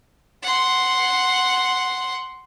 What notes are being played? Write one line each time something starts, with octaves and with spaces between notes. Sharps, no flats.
F#5 C6